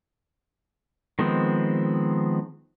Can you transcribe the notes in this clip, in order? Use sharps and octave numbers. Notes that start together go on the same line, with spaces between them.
D#3 F3 G#3 B3 C4